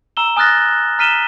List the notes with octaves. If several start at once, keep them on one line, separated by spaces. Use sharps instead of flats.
A#5 E6 E7 G7
G#5 D#6 F6 F#6 A6 A#6
F#6
A#5 F6 B6 D#7 E7 G7